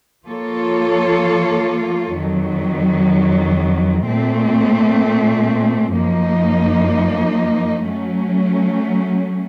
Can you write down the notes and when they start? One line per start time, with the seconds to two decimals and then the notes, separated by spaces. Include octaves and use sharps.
0.25 F3 A#3 F4 A4 C#5
2.15 F2 D#3 F#3
4.06 A#2 A3 C4
5.95 F#2 F3 A#3 D#4
7.85 F#3 A3 C#4